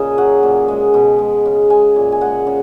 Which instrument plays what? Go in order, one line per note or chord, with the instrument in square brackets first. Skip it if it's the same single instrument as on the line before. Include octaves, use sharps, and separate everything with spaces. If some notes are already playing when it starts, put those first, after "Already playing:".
Already playing: [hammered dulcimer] A#2 C#3 G#4 A#4 D#5
F#3 F#5
A#2
G#3
B2
G#3
C#3
G#3 G#5
A#2
G#5
G#3 F#5
C#3